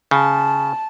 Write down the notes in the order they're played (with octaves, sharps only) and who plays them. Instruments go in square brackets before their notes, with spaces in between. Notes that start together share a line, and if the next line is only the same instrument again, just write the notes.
[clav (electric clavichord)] C#3 [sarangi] A5